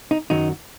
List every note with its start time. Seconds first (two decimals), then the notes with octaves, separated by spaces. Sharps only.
0.11 D#4
0.30 F#2 D#3 F#3 D#4